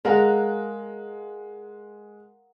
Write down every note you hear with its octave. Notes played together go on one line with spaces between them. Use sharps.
G#3 A#4 F5 F#5